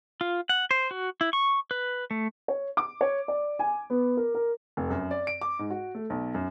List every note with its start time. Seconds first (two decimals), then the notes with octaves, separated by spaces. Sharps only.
0.21 F4
0.49 F#5
0.71 C5
0.91 F#4
1.21 E4
1.33 C#6
1.71 B4
2.11 A3
2.48 C#5
2.77 D6
3.01 C#5
3.28 D5
3.59 G#5
3.90 B3
4.17 A#4
4.35 A#4
4.77 F1
4.90 F#2
5.11 D5
5.27 D7
5.42 D6
5.59 G#2
5.70 F#4
5.95 A3
6.10 B1
6.34 F#2